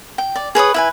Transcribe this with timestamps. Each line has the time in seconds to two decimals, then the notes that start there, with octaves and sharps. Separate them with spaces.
0.18 G5
0.36 D5
0.55 G#4 B4 C#5 D#6
0.74 E4 B4 G#5